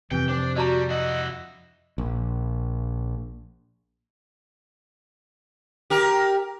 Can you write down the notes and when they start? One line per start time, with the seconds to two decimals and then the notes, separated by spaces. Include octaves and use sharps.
0.11 F2 C3 E3 G5
0.29 D4 C5
0.56 G3 F#4 D5 A5 A#5
0.90 E4 F#4 D#5
1.98 A#1
5.90 G4 A#4